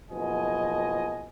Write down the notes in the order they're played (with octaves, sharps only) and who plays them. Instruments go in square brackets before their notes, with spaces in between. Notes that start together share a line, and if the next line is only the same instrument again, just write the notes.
[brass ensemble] F#1 B2 F3 D#5 G#5